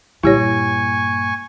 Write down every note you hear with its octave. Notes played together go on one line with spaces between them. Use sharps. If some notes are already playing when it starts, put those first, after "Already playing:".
G2 A#2 E4 G4 C#5 G#5 C#6